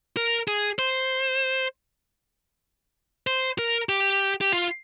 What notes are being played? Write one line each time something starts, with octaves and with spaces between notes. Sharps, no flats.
A#4
G#4
C5
C5
A#4
G4
G4
F4